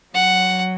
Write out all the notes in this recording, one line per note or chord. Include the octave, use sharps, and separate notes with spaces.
F#3 F#5